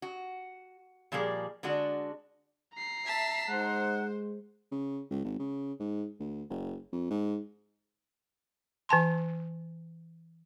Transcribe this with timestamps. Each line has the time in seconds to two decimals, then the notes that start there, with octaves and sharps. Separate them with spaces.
0.02 F#4
1.12 A#2 F3 G3 A#3 G#4
1.63 D3 G#3 D4 F#4
2.74 A#5 C7
3.06 E5 A5 B6
3.49 G#3 D#4 C5 F#5 F#6
4.72 C#3
5.11 C#2
5.25 G#1
5.40 C#3
5.80 G#2
6.20 D2
6.50 F#1
6.93 F2
7.11 G#2
8.89 E3 G#5 A5 C6